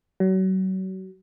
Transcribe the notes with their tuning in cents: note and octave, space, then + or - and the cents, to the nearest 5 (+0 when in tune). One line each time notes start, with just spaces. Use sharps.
F#3 +35